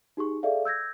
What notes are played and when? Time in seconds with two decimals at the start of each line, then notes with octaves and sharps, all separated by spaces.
0.17 D#4 G4 G#4 C#6
0.43 G#4 A4 D5 E5 F5
0.65 E6 G6 G#6 A#6